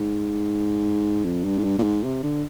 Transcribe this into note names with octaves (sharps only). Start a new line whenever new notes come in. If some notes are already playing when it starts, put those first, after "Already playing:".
Already playing: G#2
F2
G2
G#2
G2
A#2
G#2
C3
D3